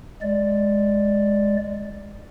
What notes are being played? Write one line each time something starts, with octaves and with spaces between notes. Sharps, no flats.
G#3 D5